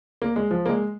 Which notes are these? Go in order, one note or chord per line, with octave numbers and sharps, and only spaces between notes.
A#3
G#3
F3
A#3
G#3